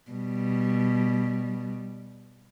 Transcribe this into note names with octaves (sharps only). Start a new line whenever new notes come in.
B2 G3